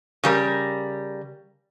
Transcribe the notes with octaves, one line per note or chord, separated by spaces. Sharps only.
C#3 G3 A#4